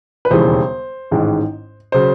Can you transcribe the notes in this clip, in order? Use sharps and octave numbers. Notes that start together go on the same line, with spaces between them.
B4
E1 D#2 C#3 E3 G3 C5
A1 G#2 D#3 G#3
C#3 F#3 C5